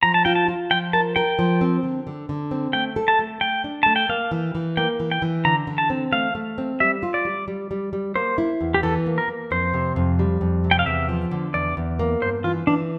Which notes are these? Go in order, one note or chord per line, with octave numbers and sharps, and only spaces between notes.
F3 A#5
A5
F4 G5
A5
F4
F3 G5
A#4 A5
A#4 G5
F3
C4
D3
D3
D3
C4
A3 G5
A4
A5
A3
A3 G5
D4
A3 A5
G5
A#3 F5
E3
E3
A#3 G5
E3
G5
E3
D3 A#5
D3
A5
C4
A3 F5
A3
C4
G3 E5
F4
D5
G3
G3
G3
G3
A#3 C5
E4
E2
G4
E3 A4
A#3
A#4
A#3
F2 C5
C3
F2
G3
F2
C3
G5
F5
E2 E5
F3
D3
E2 D5
E2
A#3
G2 C5
E3 F4
E3 D4